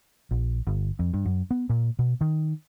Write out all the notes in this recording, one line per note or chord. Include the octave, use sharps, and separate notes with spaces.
A#1
G1
F2
G2
F#2
B3
A#2
B2
D#3